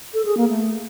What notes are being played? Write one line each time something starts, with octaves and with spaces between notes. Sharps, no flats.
A4
G#4
A#3
A3